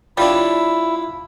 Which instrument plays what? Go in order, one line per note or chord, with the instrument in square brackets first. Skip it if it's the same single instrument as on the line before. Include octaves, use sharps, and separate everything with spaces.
[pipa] G3 D4 [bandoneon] E4 [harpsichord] F4 B4 C#5